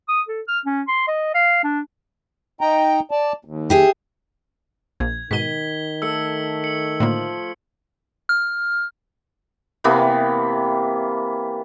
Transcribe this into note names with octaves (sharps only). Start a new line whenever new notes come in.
D#6
A4
F6
C#4
C6
D#5
F5
D4
D#4 G5 A#5
D5 A5
D#2
G4 G#4 E5
A#1 G#6
G#2 B2 D#3 B6 D#7 G7
A3 A4 E6 C#7
C#7 F#7
A2 D3 F3 A#3
F6
C3 E3 A#3 B3